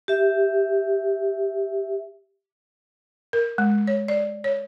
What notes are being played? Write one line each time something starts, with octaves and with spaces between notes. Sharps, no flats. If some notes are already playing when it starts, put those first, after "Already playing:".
G4 E5
A#4
G#3
C#5
D5
C#5